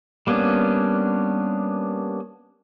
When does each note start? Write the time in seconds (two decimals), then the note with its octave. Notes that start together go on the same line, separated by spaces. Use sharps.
0.27 G3 A#3 B3 C#4 D4